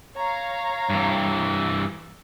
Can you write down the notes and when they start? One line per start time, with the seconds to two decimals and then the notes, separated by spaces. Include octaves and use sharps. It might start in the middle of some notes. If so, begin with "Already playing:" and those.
0.17 C#5 F5 A#5
0.90 G2 E3